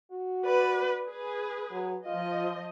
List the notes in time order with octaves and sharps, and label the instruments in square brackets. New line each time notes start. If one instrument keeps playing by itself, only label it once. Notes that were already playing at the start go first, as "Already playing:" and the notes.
[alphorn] F#4
[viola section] B4 D5
G#4 B4
[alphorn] F#3
[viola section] F3 D#5 [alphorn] F4